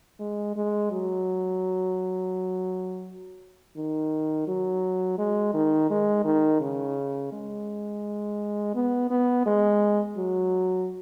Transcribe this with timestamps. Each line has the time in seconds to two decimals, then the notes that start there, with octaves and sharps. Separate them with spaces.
0.20 G#3
0.56 G#3
0.91 F#3
3.76 D#3
4.48 F#3
5.18 G#3
5.54 D#3
5.90 G#3
6.25 D#3
6.61 C#3
7.32 G#3
8.75 B3
9.10 B3
9.46 G#3
10.17 F#3